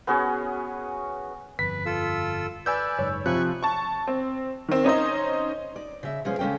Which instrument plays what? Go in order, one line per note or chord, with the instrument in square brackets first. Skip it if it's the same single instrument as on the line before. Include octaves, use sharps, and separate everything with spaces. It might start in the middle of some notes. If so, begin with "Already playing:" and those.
[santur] B3 C#4 F#4 G#4
[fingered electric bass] G1 F2 [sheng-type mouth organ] B4 [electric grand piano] B6
[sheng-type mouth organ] F4 A4 E6
[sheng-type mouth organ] B4 D5 [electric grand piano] G#5 E6 G6
[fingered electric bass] F#1 G#2 [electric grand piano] C#5
[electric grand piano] C3 F3 F#6 [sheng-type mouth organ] G#5 B5 C#6
[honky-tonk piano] A5 C#6
C4
D#3 C4
C#4 D#4 C5 D#5
[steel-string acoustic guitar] D5
C#3 E5
B2 F3 G#3 C#4 G#4
C#3 G#3 C#4 A4 G5